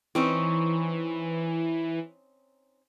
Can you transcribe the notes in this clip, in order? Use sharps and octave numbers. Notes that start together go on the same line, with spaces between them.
E3 C4 C#4 D#4